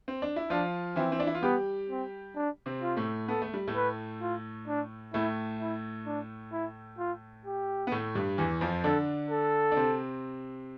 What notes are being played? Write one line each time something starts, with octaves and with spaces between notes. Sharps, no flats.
C4
D4
E4
F3 D4 F4
E3 C4 E4
C4
D4
E4
F4
G3 B3 G4
C4
D4
C3 C4
F4
A2 A3
B3 A4
A3
G3
A2 A3
B4
F4
D4
A2 A3 E4
E4
D4
E4
F4
G4
B3
A2 A3
G2 G3
E2 E3
F2 F3
D3 D4 A4
A4
D4
C3 C4